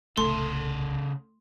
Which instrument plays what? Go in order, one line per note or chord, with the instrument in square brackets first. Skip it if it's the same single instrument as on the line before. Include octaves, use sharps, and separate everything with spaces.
[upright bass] D1 C2 [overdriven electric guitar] C#3 A4 [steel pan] A3 [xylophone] C6